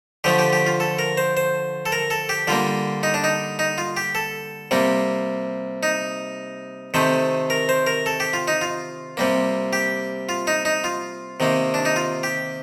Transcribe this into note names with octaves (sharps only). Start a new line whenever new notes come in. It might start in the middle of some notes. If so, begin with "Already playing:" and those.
D3 F3 A3 G4
G4
G4
F4
A4
A#4
C5
C5
A4
A#4
A4
G4
D3 G3 A#3 F4
D#4
D4
D#4
D#4
F4
G4
A4
C3 G3 A#3
D#4
C3 D#3 A3 C5
A#4
C5
A#4
A4
G4
F4
D#4
F4
C3 G3 A#3
G4
F4
D#4
D#4
F4
C3 D#3 A#3
D4
D#4
F4
G4